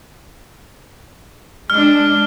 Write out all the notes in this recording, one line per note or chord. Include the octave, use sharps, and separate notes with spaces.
G#3 D4 F6